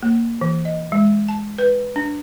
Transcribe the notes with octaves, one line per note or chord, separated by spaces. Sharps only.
A#3
E3
D#5
G#3
A5
B4
D4